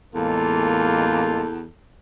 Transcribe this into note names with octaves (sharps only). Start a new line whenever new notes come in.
A1 E2 G#3 A#3 F4 A4